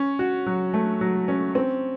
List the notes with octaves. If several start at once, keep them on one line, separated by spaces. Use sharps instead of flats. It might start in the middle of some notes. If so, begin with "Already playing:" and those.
Already playing: C#4
F#4
F#3
A3
F#3
C#4
C4